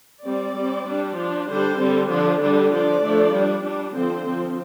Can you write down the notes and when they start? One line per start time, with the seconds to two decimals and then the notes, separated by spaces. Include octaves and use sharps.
0.24 G3 C4 D5
0.55 G3
0.60 C4
0.86 G3 D4
1.17 F3 D4
1.48 D3 G3 D4 C5
1.78 D3 G3 C4
2.09 D3 F3 D4
2.40 D3 G3 D4
2.70 F3 D4 D5
3.01 F3 A3 D4
3.33 G3 D4
3.63 G3 D4
3.94 D3 F3 C4 C5
4.24 F3 C4